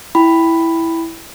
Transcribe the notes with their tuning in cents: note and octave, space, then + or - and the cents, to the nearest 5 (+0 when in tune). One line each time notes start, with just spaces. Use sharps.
E4 +0 G5 +0 B5 +5